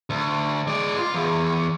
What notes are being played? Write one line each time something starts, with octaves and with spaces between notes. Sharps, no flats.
D2
G#3 D5
F4
E2